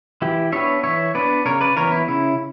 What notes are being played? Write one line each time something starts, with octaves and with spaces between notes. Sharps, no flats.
E3 E4 G4
B3 D4 C#5 E5
E3 C#5 E5
B3 D4 B4 D5
C#3 A#4 C#5
B4 D5
E3 B3 A#4 C#5
E4
C#3 E4